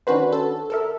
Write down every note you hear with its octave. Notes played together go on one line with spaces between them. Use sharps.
D#3 C#4 D4 F#4 B4 C5
A4
A4 A#4 E5